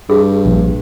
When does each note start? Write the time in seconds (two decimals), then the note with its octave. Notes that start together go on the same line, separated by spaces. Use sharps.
0.10 G2 G#4
0.45 A#1